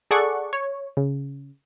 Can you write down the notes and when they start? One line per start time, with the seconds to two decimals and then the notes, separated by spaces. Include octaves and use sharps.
0.11 G#4 A4 D5 F#5 C#6
0.53 C#5
0.97 C#3